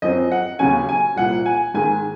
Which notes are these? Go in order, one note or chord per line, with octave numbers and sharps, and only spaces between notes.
F#2 F3 C4 D#5
F#5
D#2 C#3 F#3 C#4 G#5
G#5
C2 A#2 F3 F#5
G#5
G#2 D#3 G#3 G#5